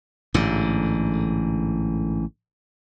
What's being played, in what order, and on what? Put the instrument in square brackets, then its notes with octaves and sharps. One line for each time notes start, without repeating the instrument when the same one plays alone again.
[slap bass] A1 G#2 D3